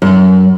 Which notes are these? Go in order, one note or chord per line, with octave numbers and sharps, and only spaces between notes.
F#2